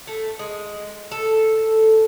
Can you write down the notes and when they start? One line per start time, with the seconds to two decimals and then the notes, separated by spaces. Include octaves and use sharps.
0.07 A3
0.39 G#3
1.12 A4